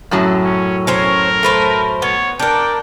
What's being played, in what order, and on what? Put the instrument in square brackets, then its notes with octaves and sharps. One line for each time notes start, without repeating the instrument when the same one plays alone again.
[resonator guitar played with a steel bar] F#2 A2 F#3
[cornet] C#4
[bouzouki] C#4 C5 C#5 [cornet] A#4
[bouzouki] A3 B4 C5
[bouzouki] B3 [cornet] C#5
[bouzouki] D4 A#4 [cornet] G5